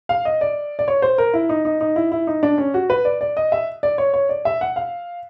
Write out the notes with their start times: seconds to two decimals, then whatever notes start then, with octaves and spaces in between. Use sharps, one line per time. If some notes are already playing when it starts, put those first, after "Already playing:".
0.09 F5
0.25 D#5
0.41 D5
0.79 D5
0.88 C#5
1.02 C5
1.18 A#4
1.34 E4
1.49 D#4
1.65 D#4
1.81 D#4
1.96 E4
2.12 E4
2.27 D#4
2.43 D4
2.58 C#4
2.74 F#4
2.90 B4
3.05 D5
3.21 D5
3.37 D#5
3.52 E5
3.83 D5
3.98 C#5
4.14 C#5
4.29 D5
4.45 E5
4.61 F#5
4.76 F5